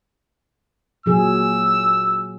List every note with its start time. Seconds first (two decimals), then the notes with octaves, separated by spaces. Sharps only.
1.06 A#2 F#3 G#4 E6